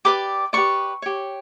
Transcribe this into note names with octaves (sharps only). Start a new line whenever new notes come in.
G4 B4 D5 D6
G4 B4 D5 C#6
G4 C#5